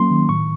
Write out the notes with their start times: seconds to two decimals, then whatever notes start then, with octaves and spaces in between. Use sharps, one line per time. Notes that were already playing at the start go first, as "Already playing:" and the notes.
Already playing: F#3 A#3 C#4 C6
0.11 D#3
0.29 A2 C#6